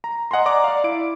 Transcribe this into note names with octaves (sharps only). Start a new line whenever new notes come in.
A#5
D#5 F#5 G#5 A#5 C6
D5 A#5 D6
D5 F5
E4 D7